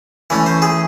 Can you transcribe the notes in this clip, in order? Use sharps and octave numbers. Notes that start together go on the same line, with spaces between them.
E3 A3 C#4 C#5
C5
G#4